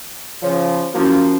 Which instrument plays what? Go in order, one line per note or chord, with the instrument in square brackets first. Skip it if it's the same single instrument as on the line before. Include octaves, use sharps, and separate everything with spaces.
[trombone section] C#3 F3 [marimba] C#5
[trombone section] F3 A#3 [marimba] C#4 E4 F#4